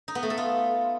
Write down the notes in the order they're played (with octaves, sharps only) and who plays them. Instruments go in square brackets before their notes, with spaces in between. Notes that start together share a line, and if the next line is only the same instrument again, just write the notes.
[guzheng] D#4
B3
A3
A4
F4